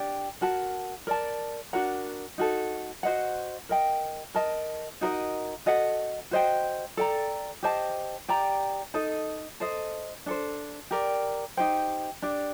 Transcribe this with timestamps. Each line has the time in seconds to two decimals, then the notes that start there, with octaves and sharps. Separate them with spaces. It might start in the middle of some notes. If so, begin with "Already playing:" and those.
Already playing: D4 G4 D5 G5
0.41 F#4 A#4 F#5 A5
1.07 A#4 D5 A5
1.73 D4 F#4 A#4 F#5
2.38 D#4 F#4 A4
3.03 F#4 C5 D#5 F#5
3.69 A#4 D#5 G5
4.35 A#4 D#5 A5
5.01 D#4 F#4 A#4 D#5
5.66 F#4 A4 D#5 F#5
6.31 F#4 C5 D#5 G5
6.97 A4 D5 G5 A#5
7.63 G4 C5 D#5 A5
8.28 G4 D5 G5 A#5
8.94 D#4 A4 D#5
9.60 A4 C5 D#5
10.26 D4 A4 C5
10.91 G4 A#4 D5
11.57 D#4 G4 C5 G5
12.22 D4 G4 D5